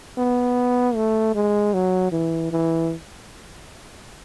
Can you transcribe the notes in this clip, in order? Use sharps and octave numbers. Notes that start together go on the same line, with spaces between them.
B3
A3
G#3
F#3
E3
E3